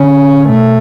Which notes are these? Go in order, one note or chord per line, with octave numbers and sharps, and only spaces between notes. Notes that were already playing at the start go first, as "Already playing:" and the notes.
Already playing: D3 C#4
B2 A3